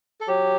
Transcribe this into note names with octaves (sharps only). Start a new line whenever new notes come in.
A4
F#3 G4